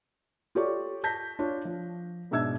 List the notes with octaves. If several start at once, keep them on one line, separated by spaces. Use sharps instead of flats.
F4 G4 A4 C#5 D5 C#6
A5 G6 A#6 B6
D4 F4 C#5
F3
G#2 B2 D4 E5 E6 G#6